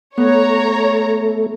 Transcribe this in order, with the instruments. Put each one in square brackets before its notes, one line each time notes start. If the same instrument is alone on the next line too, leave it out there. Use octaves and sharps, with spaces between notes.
[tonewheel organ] A3 [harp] B3 [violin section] C#5 A#5